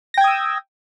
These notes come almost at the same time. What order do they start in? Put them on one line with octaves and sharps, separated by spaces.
A#6 G5 G#6 D#6 E6